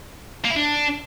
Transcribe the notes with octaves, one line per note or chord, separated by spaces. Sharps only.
A#3
E4
D4